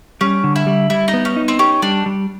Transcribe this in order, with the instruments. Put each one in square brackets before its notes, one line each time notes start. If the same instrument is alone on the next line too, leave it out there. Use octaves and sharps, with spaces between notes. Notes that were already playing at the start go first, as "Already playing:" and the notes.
[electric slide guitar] G3 [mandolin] C#4
[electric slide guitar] D3
[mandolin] E4
[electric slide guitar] G3
[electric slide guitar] G3 [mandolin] E4
[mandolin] D#4
[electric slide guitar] B3
[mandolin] C#4
[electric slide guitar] D#4
[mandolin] C4
[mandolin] C#4 [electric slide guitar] G4
[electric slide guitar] G3 [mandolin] D4
[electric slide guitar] G3